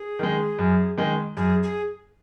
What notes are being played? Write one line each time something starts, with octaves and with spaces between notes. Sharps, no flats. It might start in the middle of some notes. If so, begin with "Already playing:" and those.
Already playing: G#4
D#3 G#3
F#2
D#3 G#3
F#2 G#4
G#4